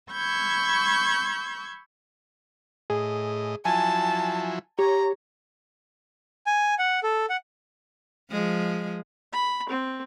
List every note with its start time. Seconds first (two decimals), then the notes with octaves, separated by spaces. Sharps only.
0.12 B5 C#6 E6 G6 G#6
2.90 A2 G#4 D#5
3.65 F3 F#3 E4 G#5 A5
4.79 G4 C#5 A#5
6.46 G#5
6.79 F#5
7.03 A4
7.29 F#5
8.31 F3 G#3
9.33 B5
9.69 C4